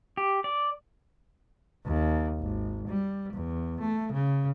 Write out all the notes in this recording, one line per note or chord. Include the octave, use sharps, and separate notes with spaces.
G4
D5
D#2
G#1
G3
E2
A3
C#3